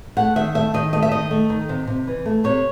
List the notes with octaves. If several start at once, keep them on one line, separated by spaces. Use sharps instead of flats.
A3 F#5
D#3 E5
A3 E5
D#3 D#5
A3 D#5
E5
D#3 D#5
A3
D#3
C3
C3
E3
A3
C3 C#5